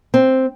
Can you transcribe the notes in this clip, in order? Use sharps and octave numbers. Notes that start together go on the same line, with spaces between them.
C4